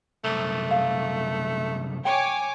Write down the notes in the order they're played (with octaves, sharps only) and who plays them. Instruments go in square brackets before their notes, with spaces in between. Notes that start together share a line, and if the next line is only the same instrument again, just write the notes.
[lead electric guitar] C2 F#2 [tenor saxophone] A3
[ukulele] F5
[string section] C#5 G#5 D6 [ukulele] G5